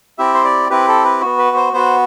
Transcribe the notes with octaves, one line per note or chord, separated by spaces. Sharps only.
C4 E4 G4 E5
C5
D5
C4 E4 G4 B4
A4
B4
B3 F#4
B4
C5
B3 F#4 C5